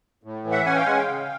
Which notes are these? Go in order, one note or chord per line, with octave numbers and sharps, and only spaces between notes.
A2
E3
E5 F#5
C#4 F#5 G#5
F5 G5
G#3 F#5 G#5
F5 G5
C#3